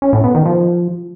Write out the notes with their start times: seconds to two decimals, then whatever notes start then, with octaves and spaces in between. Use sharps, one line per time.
0.02 C#4
0.13 A2
0.24 B3
0.35 D#3
0.46 F3